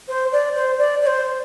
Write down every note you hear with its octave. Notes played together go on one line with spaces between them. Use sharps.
C5
D5
C5
D5
D5
C5